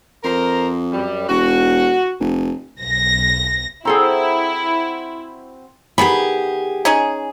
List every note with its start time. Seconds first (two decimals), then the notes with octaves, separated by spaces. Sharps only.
0.24 F2 A#4 C5 A#5
0.92 F#2 G3
1.29 E1 F#4
2.20 F1
2.80 B1 A#6
3.85 C4 E4 F#4 G#4 A4 C5 A#5
5.98 D#3 B3 G4 G#4 B5
6.85 C#4 D#4 G#4